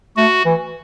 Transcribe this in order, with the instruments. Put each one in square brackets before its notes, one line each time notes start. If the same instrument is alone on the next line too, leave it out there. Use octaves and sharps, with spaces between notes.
[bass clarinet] A3 [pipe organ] F#4
[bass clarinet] E3